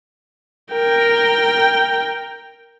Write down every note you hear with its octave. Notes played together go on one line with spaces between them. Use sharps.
A#4 G5